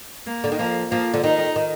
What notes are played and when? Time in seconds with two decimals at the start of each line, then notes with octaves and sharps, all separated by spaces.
0.27 A#3
0.44 D3
0.52 D#3
0.59 F3 A#3
0.91 F3 A#3
1.14 D3
1.24 D#3 D#4
1.56 D#3